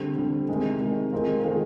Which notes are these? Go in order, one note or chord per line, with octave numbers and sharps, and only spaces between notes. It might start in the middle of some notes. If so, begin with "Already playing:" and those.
Already playing: D3 G3 C4
D3 G3 C4
C3 D#3 G#3
C3 D#3 G#3
D#3 G#3 C4 F4 A#4
D#3 G#3 C4 F4 A#4